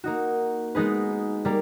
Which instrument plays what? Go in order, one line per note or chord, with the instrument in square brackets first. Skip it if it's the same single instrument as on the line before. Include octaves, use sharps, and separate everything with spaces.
[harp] A#3 D#4 F#4
G#3 B3 D#4 G#4 B4
G3 A#3